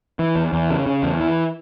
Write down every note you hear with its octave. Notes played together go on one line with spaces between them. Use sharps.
E3
E2
E2
C#3
C#3
E2
E3